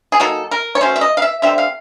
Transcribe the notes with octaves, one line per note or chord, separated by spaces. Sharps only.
G#4
F#3 A#3 D#4 A4
A#4
C#5
F#3 A3 C#4 C5
E5
D#5
F5
E5
D3 G3 C4 E5
F5